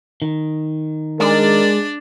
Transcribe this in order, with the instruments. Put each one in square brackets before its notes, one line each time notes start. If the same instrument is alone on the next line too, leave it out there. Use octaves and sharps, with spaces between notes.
[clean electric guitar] D#3
[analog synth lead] G#3 [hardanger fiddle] D4 D5 [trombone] A#4